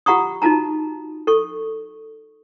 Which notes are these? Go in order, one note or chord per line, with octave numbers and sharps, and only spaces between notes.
F4 G4 F#5 A#5 C#6 D#6
D#4 F4 F#4 A5 A#5
A4 C#6